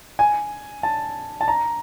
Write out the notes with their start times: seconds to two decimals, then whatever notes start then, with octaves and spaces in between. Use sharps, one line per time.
0.19 G#5
0.83 A5
1.41 A5
1.48 A#5